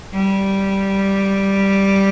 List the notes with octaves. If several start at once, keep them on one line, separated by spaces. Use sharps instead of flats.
G3